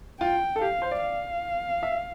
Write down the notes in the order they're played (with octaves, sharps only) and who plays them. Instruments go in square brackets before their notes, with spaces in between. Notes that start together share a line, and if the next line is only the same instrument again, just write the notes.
[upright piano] F4 [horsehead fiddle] G5
[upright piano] A4
[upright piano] G4 [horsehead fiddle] F5
[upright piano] C5
D5
[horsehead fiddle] F5
[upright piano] E5